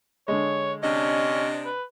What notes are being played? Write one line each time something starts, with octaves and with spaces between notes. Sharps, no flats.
D3 G#3 C#5
C3 C#4 D4 D#5
B4